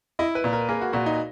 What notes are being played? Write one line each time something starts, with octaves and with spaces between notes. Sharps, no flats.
E4 D#5
B4
A#2
A#4
A#3 G#4
F#4
A#2 F#4
D#4